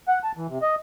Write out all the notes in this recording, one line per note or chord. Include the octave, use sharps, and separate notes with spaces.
F#5
A5
E3
C3
D#5